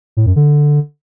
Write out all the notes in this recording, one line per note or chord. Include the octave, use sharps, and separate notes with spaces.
A2
F#2
D3